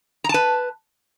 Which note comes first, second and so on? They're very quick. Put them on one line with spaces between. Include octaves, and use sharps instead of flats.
A#5 A5 B4